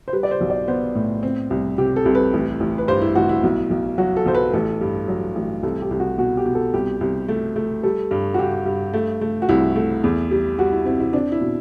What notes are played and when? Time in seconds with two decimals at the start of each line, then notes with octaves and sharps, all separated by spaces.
0.08 C5
0.13 G3 B4
0.23 D5
0.31 C5
0.41 B1
0.50 D5
0.68 B3 C5
0.95 A2
1.23 C4
1.50 C2
1.78 C3 G4
1.96 A4
2.05 C2
2.15 B4
2.33 A1
2.60 A1
2.78 B4
2.88 G2 C5
3.02 E4
3.15 A1 F#4
3.29 E4
3.43 B1
3.71 B1
3.98 F#3 F#4
4.17 A4
4.26 B1 C5
4.35 B4
4.53 A1 A4
4.81 G2
5.08 F#3
5.35 A1
5.63 C2 A4
5.82 G4
5.91 C2
6.00 F#4
6.18 B2 F#4
6.37 G4
6.46 B2
6.55 A4
6.74 C2 G4
7.01 C2
7.28 A3
7.56 A3
7.83 G3 A4
8.11 G2
8.34 F#4
8.38 G2 G4
8.66 G2
8.94 A3
9.21 A3
9.42 F#4
9.49 C2 E4
9.76 A3
10.04 E2
10.31 G3
10.58 G3 F#4
10.72 E4
10.86 C4 E4
11.00 E4
11.13 C4 D4
11.32 E4
11.41 B2